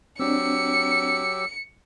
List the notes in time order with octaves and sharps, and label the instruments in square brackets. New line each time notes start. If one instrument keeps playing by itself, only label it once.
[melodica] F#3 G4 E6 [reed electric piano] C4 D4 [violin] C#7